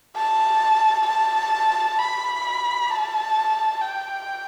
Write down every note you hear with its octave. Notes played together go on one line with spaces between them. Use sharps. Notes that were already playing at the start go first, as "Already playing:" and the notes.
A5
A5
B5
A5
G5